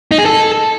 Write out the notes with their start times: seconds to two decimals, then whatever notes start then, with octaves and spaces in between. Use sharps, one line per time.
0.11 D#4
0.19 G#4
0.26 A4